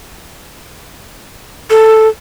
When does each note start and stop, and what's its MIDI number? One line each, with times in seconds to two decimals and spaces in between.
1.70 2.08 69